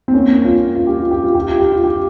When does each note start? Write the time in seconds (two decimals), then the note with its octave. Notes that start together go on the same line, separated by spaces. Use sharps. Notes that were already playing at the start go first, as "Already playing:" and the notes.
0.08 C4
0.14 A#3 C#4
0.44 C#4 F4
0.75 F4
0.87 G4
0.99 F4
1.11 G4
1.24 F4
1.35 G4
1.47 F4
1.60 G4
1.72 F4
1.84 G4